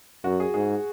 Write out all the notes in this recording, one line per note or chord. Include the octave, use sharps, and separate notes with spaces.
F#2 F#4
G#4
G#2 G#4